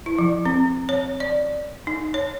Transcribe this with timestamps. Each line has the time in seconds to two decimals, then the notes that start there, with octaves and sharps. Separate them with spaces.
0.06 E4
0.18 F3
0.45 C4
0.89 C#5
1.20 D5
1.87 D#4
2.14 C#5